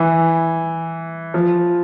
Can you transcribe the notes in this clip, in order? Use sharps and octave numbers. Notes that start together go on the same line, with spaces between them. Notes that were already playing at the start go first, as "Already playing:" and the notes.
Already playing: E3
F3